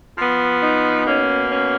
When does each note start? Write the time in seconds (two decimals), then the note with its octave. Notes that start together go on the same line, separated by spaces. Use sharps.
0.18 F3 B3
0.61 D#4
1.05 B2 A#3 C#4
1.49 C#4